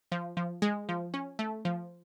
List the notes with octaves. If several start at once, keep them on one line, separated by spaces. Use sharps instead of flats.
F3
F3
G#3
F3
C#4
A3
F3